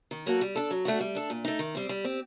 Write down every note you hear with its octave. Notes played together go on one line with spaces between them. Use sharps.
D#3
F#3 A#3 F#4 A4
G3
D4 A4
F#3
A3 D4 F#4
G3
D4 A4
A#2
A3 D#4
D#3
G3 C4
G3
C4 G4